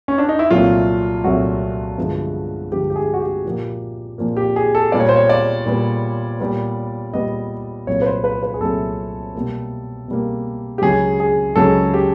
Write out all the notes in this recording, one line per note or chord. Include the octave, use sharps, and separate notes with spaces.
C#4
D4
D#4
E4
C2 A#2 F#3 A3 F4
C2 A#2 F#3 A3 F#4
G2 D3 F3 G#3 B3
G2 D3 F3 G#3 B3 G4
G4
G#4
F#4
G4
A#2 F3 A#3
A#2 F3 A#3
G4
G#4
A4
A#2 G3 B3 D5
C#5
C5
C#5
D5
A#2 G3 B3
A#2 G3 B3
A#2 G3 B3 D#5
C2 A#2 F#3 A3 C#5
B4
C5
B4
B4
G#4
C2 A#2 F#3 A3 A4
B2 G3 A#3
B2 G3 A#3
G4
C#2 C#3 F#3 G#4
G#4
C#2 C#3 F#3 A4
G4